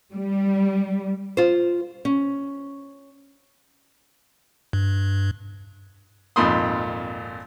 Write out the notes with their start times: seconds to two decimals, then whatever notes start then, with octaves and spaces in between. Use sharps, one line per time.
0.13 G3
1.37 F4 C5
2.05 C#4
4.73 G2
6.36 G#1 F2 A#2 B5 C6 D#6